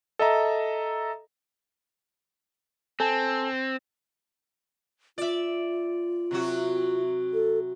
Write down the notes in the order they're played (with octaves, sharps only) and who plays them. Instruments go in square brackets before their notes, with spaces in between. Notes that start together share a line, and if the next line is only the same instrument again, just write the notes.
[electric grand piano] A4 D#5 E5 A#5
[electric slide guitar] C4 [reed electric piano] A4 G#5 A5
[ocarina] F4 [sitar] D5 E5
[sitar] C3 F#3 F#4
[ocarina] A4